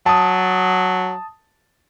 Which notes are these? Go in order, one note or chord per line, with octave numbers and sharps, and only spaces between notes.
F#3 A5 D#6